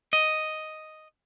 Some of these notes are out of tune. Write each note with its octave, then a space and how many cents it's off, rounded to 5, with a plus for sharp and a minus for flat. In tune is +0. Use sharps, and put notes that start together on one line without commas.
D#5 +0